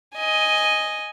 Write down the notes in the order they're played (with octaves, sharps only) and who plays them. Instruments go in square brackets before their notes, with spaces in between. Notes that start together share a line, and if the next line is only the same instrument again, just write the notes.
[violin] D#5 G#5